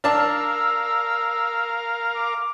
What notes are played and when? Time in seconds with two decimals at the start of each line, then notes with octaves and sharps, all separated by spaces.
0.04 D4 A#4 F5 A5 E6
2.14 D6